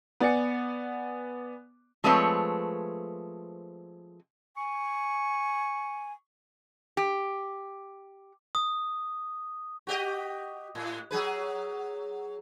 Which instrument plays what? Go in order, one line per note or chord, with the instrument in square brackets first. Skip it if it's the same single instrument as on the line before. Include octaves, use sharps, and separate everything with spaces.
[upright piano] B3 D5 G#5 C#7
[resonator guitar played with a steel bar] F3 G#3 A3 C4 B4 C#5
[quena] G#5 [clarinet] C#6
[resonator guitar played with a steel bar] G4
[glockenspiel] D#6
[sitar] F#4 G4 D#5
A2
F#3 G#4 B4